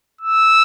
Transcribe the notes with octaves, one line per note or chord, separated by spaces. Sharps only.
E6